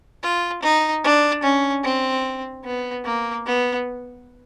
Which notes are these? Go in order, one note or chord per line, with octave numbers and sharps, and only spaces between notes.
F4
D#4
D4
C#4
C4
B3
A#3
B3